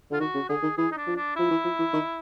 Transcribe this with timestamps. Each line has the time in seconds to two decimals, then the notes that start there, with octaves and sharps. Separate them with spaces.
0.11 D3 F4
0.20 D#3 F#4
0.35 C#3
0.49 D3 G#4
0.63 D#3
0.77 E3 G#4
0.91 D#4
0.97 D4
1.07 F3
1.16 D4
1.36 F3 E4
1.51 E3
1.64 F3
1.79 E3
1.93 D#3